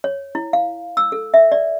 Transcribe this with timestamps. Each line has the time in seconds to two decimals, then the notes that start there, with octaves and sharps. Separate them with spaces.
0.04 C#5
0.35 E4
0.53 F5
0.97 E6
1.12 A4
1.34 E5
1.52 D5